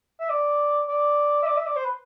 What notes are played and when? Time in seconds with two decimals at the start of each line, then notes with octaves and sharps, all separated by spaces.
0.20 E5
0.30 D5
0.89 D5
1.43 E5
1.47 D5
1.57 E5
1.67 D5
1.76 C5
1.85 B4